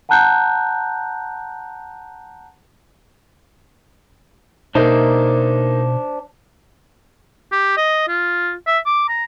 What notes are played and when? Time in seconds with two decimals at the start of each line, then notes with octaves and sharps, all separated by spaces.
0.09 F#5 A5 A#5 F#6 G6
4.75 B2 A#3 D4 D#4 C5 E5
7.52 G4
7.77 D#5
8.08 F4
8.67 E5
8.86 D6
9.09 A#5